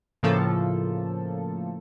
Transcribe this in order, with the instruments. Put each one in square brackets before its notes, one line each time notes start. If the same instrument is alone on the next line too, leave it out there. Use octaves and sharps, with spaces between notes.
[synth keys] A2 C#3 F3 A#3 A4